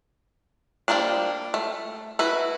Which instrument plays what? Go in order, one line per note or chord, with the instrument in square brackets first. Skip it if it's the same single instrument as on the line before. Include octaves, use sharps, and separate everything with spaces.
[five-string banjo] F3 G3 G#3 A#3 D4
A3
E4 F#4 B4